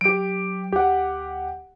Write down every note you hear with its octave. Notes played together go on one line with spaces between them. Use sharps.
F#3 G4 D7
D2 G4 F#5